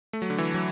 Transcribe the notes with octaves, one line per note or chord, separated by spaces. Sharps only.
A3
F#3
D3
E3
F#3